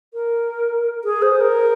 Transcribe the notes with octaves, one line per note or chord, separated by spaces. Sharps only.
A#4
G#4
C5
A#4